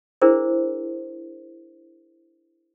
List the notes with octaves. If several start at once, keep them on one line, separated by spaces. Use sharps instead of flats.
D4 E4 G#4 A#4 C5